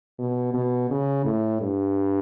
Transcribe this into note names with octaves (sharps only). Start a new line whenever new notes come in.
B2
B2
C#3
A2
G2